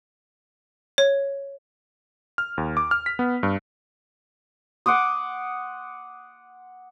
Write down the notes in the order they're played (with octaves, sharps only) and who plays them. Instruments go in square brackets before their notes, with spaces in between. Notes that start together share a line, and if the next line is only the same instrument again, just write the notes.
[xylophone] C#5
[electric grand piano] F6
D#2
D6
F6
B6
B3
G2
[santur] F#5 C6 D6 D#6